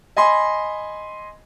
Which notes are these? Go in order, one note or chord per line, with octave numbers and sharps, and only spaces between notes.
D#5 G#5 B5 C6